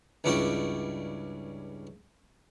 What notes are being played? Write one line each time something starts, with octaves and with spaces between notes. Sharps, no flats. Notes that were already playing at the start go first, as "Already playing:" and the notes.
C#2 G2 C#4 E4 D5 G5